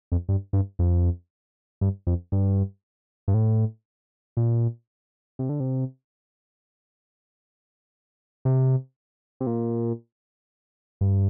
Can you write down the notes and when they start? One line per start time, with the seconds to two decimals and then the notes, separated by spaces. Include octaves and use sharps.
0.12 F2
0.29 G2
0.53 G2
0.79 F2
1.81 G2
2.07 F2
2.32 G2
3.28 G2
3.34 A2
4.37 A#2
5.39 C3
5.49 D3
5.60 C3
8.45 C3
9.40 C3
9.47 A#2
11.01 G2